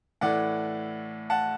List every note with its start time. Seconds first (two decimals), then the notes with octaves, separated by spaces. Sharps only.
0.21 A2 E3 A3 D5 F#5
1.30 F#5 A5